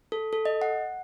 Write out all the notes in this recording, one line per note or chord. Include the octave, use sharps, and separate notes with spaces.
A4
A4
D#5
F#5